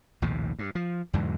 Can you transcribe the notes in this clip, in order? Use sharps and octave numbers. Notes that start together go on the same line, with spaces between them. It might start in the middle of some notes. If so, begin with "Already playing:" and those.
A#1 D#2 A2 C3
G2
F3
E2 G#2 D3 F#3